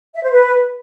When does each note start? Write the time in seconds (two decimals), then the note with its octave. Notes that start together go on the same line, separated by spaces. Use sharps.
0.14 E5
0.23 C5
0.32 B4